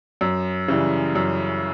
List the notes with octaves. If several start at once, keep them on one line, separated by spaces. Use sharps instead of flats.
F#2
C#3 E3 G3
F#2